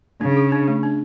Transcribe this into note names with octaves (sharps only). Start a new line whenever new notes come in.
C#3 D4
G#4
D4
A3
D4